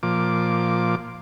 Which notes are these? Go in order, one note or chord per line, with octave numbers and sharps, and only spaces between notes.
A#2 F3 D6